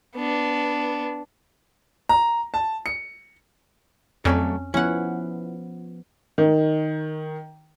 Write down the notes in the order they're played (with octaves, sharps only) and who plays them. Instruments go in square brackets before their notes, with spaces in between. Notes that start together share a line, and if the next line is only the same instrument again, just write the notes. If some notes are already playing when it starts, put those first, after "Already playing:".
[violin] B3 D4
[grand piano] A#5
A5
C#7
[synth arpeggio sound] F2 [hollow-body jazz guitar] F#3 A3 D5 [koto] C#4
[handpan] F3 B3 [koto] C#4 F#5 [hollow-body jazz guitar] E4
[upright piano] D#3